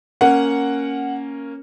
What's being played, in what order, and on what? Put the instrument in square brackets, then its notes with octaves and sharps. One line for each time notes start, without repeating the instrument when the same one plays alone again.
[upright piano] A#3 C#4 [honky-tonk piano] F#5